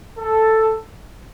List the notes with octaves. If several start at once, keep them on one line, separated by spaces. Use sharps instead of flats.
A4